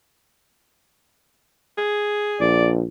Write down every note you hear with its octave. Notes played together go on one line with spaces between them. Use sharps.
G#4
A#1 D5